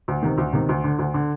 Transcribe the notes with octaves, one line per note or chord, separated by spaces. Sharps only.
D2
C3 D#3
D2
C3 D#3
D2
D3
D2
D3